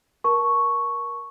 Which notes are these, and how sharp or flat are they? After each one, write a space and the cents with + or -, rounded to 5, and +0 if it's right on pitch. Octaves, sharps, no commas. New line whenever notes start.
A#4 +25 A5 +0 C#6 +0